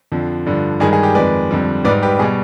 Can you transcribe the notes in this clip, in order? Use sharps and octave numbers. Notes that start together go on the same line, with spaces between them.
F2 D3 F3
G2 D3 F3
G2 D#3 G#3 G#4
G#4
G4
F2 D#3 G#3 B4 D5
F2 D3 G3
G#2 G3 B4 D5
G4 B4
B2 G3 G#4